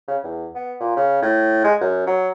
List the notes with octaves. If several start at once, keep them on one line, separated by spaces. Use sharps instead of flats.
C#3
E2
B3
A#2
C#3
A2
G#3
F#2
F#3